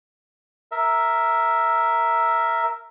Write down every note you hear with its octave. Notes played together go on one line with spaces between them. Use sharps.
A#4 E5